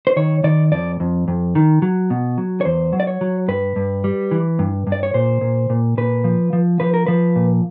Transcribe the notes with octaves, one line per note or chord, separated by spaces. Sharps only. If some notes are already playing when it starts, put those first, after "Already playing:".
C5
D#3 C#5
D#3 D5
F2 D5
F2
F2
D#3
F#3
B2
F#3
C#5
E2 C5
F#3
D5
C#5
F#3
G2 B4
G2
G3
E3
G2
G2
D5
C#5
A#2 C5
A#2
A#2
A#2 B4
F3
F3
F3 B4
A#4
F3 B4
A#2